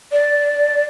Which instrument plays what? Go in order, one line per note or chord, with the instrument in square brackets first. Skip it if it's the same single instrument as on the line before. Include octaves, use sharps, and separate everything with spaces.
[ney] D5